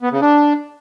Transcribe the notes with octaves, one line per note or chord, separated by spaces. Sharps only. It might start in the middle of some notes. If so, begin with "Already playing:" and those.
B3
C#3
D4